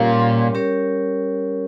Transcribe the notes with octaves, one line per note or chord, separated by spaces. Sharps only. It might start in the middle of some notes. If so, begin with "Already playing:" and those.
Already playing: A#2 G3 C#4 G4 A#4 C#5
G3
C#4 G4 A#4 C#5